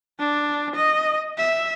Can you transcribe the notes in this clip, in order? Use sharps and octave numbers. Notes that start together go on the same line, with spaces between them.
D4
D#5
E5